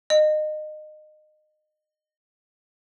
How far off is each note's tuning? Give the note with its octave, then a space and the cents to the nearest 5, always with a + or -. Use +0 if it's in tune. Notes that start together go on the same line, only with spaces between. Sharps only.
D#5 -25